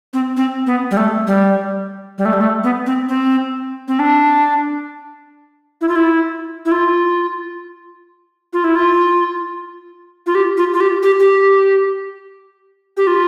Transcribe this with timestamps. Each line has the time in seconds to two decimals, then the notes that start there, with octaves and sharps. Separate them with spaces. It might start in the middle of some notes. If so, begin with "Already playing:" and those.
0.13 C4
0.37 C4
0.67 B3
0.91 G3
0.97 A3
1.27 G3
2.18 G3
2.25 A3
2.33 G3
2.41 A3
2.64 B3
2.86 C4
3.09 C4
3.88 C4
3.99 D4
5.81 E4
5.89 F4
5.96 E4
6.65 E4
6.72 F4
8.53 F4
8.64 E4
8.75 F4
10.26 F4
10.35 G4
10.57 F4
10.74 F4
10.80 G4
11.03 G4
11.20 G4
12.97 G4
13.07 F4